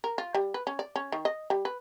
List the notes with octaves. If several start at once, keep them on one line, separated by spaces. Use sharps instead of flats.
A#4
F4
G3
B4
C#4
D5
C#4
D#3
D#5
G3
B4